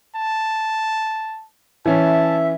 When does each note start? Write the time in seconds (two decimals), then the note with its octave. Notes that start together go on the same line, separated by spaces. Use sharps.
0.15 A5
1.86 E3 C#4 E5 A5